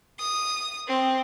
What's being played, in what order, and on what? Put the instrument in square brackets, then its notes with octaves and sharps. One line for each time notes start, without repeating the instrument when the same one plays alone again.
[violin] D#6
C4